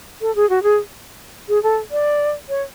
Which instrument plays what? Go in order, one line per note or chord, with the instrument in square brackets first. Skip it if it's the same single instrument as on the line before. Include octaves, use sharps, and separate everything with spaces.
[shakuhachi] A4
G#4
F#4
G#4
G#4
A4
D5
C#5